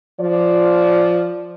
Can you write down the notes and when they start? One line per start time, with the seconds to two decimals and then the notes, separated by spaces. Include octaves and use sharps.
0.20 F3 D5